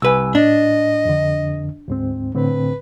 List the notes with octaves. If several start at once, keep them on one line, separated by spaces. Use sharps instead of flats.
C2 B4 G#5 E6
A2 D4 D#5
F2 D3
D2 G#2 C4
A2 D3 C4 B4